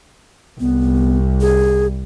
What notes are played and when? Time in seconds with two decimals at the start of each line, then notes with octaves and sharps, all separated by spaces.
0.60 C2 B3
1.41 G#4